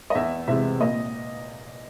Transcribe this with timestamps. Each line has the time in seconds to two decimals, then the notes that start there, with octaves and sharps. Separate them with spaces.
0.10 D#5
0.15 E2 E5
0.48 C3 E3 G#3 E5
0.80 A#2 D#5